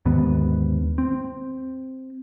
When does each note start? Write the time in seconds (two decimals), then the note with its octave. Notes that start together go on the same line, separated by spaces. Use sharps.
0.06 D#2 G#2 D3 B3
0.98 C4